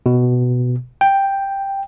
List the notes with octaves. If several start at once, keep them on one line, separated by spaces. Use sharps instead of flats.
B2
G5